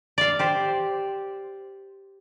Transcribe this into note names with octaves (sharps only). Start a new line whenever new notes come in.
D5 F5
G4 C5